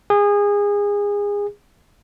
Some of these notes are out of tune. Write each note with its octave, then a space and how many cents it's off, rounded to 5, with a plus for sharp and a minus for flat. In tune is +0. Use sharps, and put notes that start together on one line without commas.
G#4 -25